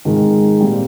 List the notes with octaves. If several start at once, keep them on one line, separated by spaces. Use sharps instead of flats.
G#2 D#3 G#3 C4 F4
A#2 G3 C4